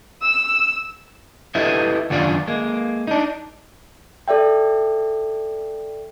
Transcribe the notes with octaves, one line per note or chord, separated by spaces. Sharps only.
E6
E4 G4 A4 B4 D#5 E5
F#2 D#3 D4 F4 D5
G#3 A#3
D4 D#4
A4 D5 E5 G5